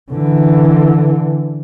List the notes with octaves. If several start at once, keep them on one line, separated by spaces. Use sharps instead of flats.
D3 E3